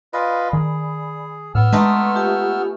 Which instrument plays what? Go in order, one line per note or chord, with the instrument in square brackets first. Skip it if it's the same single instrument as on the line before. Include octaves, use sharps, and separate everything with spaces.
[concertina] F4 B4 D#5 [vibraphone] D5 G#5 B5
[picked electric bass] D#3 [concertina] G#4
[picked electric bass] A2 [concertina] B3 E6 F6
[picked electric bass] G#3 [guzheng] A3 D#4 B4 [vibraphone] C6 C#6
[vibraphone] F4 G4 G#5